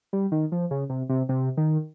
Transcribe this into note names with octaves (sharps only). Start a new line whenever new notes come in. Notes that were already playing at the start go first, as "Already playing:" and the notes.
G3
D#3
F3
C#3
C3
C3
C3
D#3